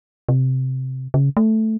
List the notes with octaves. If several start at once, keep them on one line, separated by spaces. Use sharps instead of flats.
C3
C#3
A3